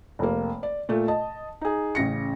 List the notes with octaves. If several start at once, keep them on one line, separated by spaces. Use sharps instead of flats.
F1 A#3
D5
A#2 A3
D#5 A5
D#4 G#4
A1 C#3 A#6 C#7